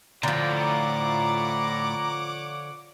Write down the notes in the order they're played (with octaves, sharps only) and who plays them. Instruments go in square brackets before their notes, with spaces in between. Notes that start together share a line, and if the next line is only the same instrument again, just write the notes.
[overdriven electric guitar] A2 G5 [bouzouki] D3 F3 [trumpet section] C#5 F#5 D6 [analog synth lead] A#5